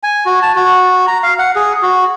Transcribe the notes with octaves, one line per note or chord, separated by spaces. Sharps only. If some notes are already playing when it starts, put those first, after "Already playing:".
G#5
F#4
A5
F#4
A#5
F5
F#5
G#4
F#4